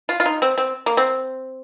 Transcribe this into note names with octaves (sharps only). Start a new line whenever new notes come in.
F4
F4
D#4
C4
C4
A#3
C4